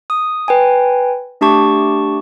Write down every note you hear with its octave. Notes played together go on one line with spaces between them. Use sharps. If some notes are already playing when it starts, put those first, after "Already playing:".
D#6
B4 G5 G#5
A3 D4 G4 A5 C#6 D6